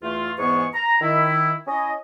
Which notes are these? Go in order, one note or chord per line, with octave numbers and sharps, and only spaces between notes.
E2 A3 F4
E2 G#2 E3 B3 G#4 C#6
A#5
D#3 E4
C#4 E4 D#5